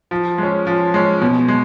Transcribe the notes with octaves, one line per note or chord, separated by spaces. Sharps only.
F3
G#3 C#4
F3
G#3 C#4
B2
G#3